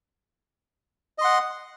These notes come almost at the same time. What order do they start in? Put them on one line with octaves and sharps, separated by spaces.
D#5 C6 F#5